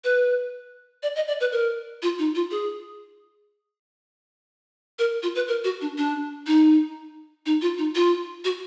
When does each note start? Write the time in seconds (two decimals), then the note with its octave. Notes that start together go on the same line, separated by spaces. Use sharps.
0.04 B4
1.03 D5
1.16 D#5
1.28 D5
1.41 B4
1.52 A#4
2.02 F4
2.19 D#4
2.35 F4
2.51 G#4
4.99 A#4
5.23 F4
5.35 B4
5.48 A#4
5.64 F#4
5.81 D4
5.98 D4
6.47 D#4
7.46 D#4
7.62 F4
7.78 D#4
7.95 F4
8.45 F#4